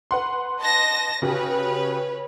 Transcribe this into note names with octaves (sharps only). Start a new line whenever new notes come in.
B4 F#5 C6
D#5 A5 A#6
C#3 F#4 G4 B4 C#5